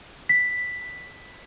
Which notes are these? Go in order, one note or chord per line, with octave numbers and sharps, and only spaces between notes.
B6